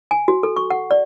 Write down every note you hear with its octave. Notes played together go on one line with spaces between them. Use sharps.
G#5
F#4
A4
C#6
F#5
D5